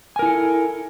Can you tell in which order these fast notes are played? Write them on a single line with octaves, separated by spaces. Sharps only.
G#5 A#4 E4 A4